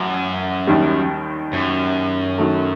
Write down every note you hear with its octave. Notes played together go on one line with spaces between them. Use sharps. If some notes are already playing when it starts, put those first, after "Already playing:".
Already playing: A1 F#2
D#2 D#3 G3
F#2
D#3 F#3 A3